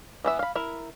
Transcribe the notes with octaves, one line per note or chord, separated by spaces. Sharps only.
E3 B3 E5
F5 B5
E4 A#4